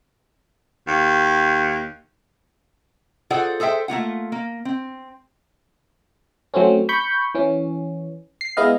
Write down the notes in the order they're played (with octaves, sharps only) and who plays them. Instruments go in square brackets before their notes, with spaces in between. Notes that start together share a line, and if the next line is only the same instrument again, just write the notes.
[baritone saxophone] D#2
[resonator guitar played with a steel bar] F4 G#4 A4 C5 D5 F#5
G#4 A4 C5 E5 G5
A3 A#3 F4 F#5
A#3
C4
[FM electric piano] F#3 A3 C4 C#4
B5 C#6 G6
E3 C#4
C7
G#3 B3 E4 D#5 F5